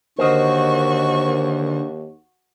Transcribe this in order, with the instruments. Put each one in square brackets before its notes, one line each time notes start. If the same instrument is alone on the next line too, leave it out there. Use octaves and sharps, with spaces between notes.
[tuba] D#2 [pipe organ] D3 [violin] F#4 C#6 [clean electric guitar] A#4 C5 D#5